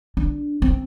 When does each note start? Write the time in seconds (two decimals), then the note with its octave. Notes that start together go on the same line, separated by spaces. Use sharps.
0.17 D4
0.62 C4